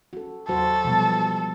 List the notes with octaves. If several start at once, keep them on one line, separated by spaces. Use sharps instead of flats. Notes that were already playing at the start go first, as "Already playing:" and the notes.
C#4 F#4 A4
D#2 F#3 F#4 A4 C5
B2 F3 G3 B3